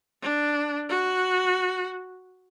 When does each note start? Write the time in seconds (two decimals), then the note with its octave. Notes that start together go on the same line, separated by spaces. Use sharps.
0.22 D4
0.89 F#4